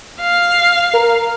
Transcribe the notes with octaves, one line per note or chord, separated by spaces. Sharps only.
F5
A#4